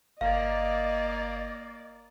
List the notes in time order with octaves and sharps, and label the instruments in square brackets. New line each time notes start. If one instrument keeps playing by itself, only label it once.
[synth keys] G1 G#6 [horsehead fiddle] A#3 D5 [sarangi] D#5 [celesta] F5